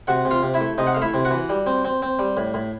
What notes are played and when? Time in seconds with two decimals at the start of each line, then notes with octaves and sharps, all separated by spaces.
0.07 C3 F#4 F#5
0.25 C3
0.31 F4 F5
0.43 C3
0.54 E4 E5
0.61 A3
0.78 C3 D#4 D#5
0.87 F#5
0.94 A3 F5
1.02 E4 E5
1.14 C3
1.25 F#4 F#5
1.31 E3
1.49 G3
1.67 C4
1.85 C4
2.02 C4
2.19 G3
2.37 A2
2.54 A2